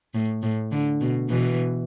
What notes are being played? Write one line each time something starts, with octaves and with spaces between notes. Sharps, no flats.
A2
A2
D3
B2
B2 E3